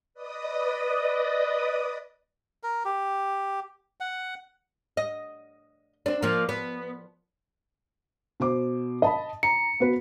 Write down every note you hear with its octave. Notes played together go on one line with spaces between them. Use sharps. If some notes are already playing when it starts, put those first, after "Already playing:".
B4 D5 D#5 D#6
A#4
G4
F#5
D#5
C4 D4
F3 A#3
B3
B2 C5 D6
D#5 A5 B5
A#5 C#7
B3 F#4 B4